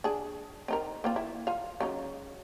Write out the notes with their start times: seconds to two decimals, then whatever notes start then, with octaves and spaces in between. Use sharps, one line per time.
0.04 D4 G#4
0.68 C4 D#4 A#4
1.04 A#3 C4 F4
1.16 E4
1.47 F4 F5
1.80 C#3 F#3 D#4